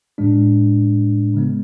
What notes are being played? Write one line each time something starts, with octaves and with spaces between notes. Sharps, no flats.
A2 G#3 D4
C#3 G#3 B3